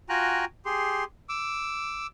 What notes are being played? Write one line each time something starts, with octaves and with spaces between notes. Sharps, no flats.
F4 F#4 G5 G#5 A#5 F#6
G4 G#4 C6
D6 E6